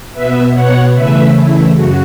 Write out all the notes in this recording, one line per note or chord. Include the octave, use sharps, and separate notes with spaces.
B2 B3 B4 E5
C#5 F#5
C#3 E3 A3 B4 E5
E4
F#2 C#3 F#4